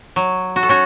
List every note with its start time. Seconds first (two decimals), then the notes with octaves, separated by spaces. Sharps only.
0.16 F#3
0.56 F#4
0.63 A4
0.69 C#4 F#4